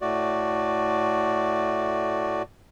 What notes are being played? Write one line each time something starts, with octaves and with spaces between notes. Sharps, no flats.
A2 A3 F#4 D5